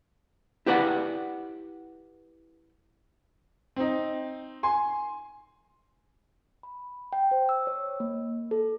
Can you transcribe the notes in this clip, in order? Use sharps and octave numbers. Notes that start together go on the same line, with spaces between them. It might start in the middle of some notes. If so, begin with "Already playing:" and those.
E4 G4 B4 D5 F#5
C4 D#4
G#5 C6
B5
G5
C5
E6
C#5
A#3
A4